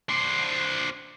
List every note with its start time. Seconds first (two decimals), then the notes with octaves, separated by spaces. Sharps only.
0.09 D4 C5